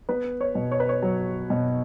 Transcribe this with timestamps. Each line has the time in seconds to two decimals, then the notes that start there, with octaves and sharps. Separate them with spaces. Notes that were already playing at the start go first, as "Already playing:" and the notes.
0.09 B3 B4
0.41 C#5
0.55 B2
0.72 C#5
0.80 B4
0.89 C#5
1.02 F#3
1.50 B2